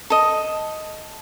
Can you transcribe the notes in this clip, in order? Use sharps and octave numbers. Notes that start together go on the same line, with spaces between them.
A4 D#5